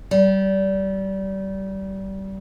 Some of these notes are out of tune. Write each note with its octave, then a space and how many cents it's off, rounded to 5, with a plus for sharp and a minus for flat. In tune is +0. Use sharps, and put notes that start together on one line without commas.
G3 -25